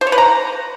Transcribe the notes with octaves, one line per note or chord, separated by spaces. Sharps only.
C5
C#5
B4
A#5